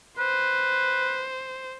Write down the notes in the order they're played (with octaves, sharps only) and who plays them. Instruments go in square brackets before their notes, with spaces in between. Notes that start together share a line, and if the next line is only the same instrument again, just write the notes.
[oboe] B4 [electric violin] C5